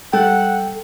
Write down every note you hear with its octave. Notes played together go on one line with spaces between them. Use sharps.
G3 A4 F#5 G5